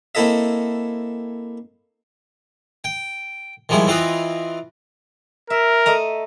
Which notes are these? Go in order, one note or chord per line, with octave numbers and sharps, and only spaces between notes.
A#3 C4 E4 A4 D#5 E5
G5
D#3 F3 G3 G#3 E4
E3 C4 F4 B4 D#5
A#4 E5
A3 D#5 A#5